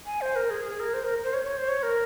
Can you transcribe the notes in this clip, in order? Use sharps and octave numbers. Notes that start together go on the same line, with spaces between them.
G#5
C5
A#4
G#4
G#4
A#4
C5
A#4
C5
C#5
C#5
C5
C#5
A#4